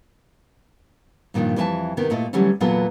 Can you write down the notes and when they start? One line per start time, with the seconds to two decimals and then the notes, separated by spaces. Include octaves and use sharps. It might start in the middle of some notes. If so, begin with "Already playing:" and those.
1.34 G2 A#2 D#3 F3 D4
1.56 F2 E3 D4 G4 E5 A5
1.97 C3 D#3 B3
2.10 A#2 A3 E4 D#5
2.33 D3 E3 F#3 G3 A3 C#4
2.60 E2 A#2 F#3 B3 F4 A4